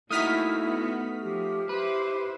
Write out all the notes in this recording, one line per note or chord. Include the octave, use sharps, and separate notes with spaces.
A3 A#3 D#4 E4 F#4 D#6 F6 B6
B3
F3 G4
E4 G4 B4 C5